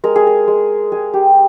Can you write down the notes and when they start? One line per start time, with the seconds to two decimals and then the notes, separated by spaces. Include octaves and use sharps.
0.04 G#3 A#4
0.16 G#4
0.27 A#4
0.48 G#3
0.92 G#3 G#4
1.14 G4